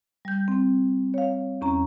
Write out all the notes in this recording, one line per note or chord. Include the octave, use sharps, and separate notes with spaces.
G3 G6
C4
C#5 F5
E2 C#4 A#5